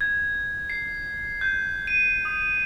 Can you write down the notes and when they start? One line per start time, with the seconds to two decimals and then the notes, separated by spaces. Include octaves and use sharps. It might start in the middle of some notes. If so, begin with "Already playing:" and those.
0.01 G#6
0.70 C7
1.41 G6
1.87 D#7
2.25 D#6